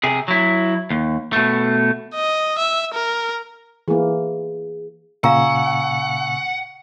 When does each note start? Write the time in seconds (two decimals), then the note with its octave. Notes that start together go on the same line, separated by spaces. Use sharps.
0.03 C3 G#4
0.28 F#3 E4
0.90 D#2
1.33 B2 A3
2.15 D#5
2.59 E5
2.94 A#4
3.88 E3 A#3 G#4
5.24 A#2 C#3 F5 F#5 G#5 A#5 C#6 E6